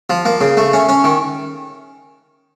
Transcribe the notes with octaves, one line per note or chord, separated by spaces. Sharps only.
F3
A#3
C#3
A3
C#4
C#4
D#3